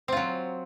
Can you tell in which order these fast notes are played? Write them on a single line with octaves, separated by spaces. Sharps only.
C4 F4 F#3